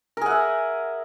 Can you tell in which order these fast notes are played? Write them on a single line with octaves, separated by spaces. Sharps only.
A#4 G#4 F#5 E5